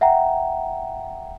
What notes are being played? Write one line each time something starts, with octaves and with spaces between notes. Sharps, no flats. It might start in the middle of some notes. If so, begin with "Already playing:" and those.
E5 F#5 G5 A#5